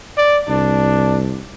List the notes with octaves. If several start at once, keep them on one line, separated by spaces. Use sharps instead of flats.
D5
C2 D4